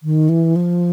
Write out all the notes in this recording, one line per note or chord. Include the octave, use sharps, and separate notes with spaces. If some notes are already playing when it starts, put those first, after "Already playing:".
D#3
E3
F3